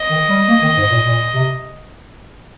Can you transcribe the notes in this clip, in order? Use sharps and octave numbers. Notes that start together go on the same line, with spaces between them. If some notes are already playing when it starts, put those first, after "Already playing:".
Already playing: D#5
D#3
G3
A#3
D#3
G#2
A#2
A#2
C3